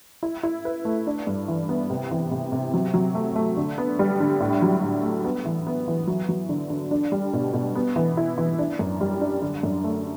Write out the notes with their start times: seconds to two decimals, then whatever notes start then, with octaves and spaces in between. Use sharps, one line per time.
0.23 E4
0.43 E4
0.65 B4
0.85 A3
1.07 D4
1.27 G2
1.48 E3
1.69 B3
1.90 C3
2.11 E3
2.31 C3
2.52 C3
2.74 F#3
2.94 F#3
3.15 A3
3.36 A3
3.57 D3
3.78 B3
3.99 G3
4.20 D3
4.40 A2
4.62 F#3
4.82 A2
5.03 A3
5.24 B3
5.45 E3
5.67 B3
5.88 E3
6.07 F#3
6.29 F#3
6.49 D3
6.70 D3
6.91 D4
7.12 G3
7.33 B2
7.54 B2
7.75 B3
7.96 E3
8.17 E4
8.38 E3
8.59 D4
8.79 F#2
9.01 G3
9.21 D4
9.42 D3
9.63 F#2
9.84 A3